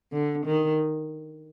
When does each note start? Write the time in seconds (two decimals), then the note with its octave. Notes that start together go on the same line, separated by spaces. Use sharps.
0.12 D3
0.46 D#3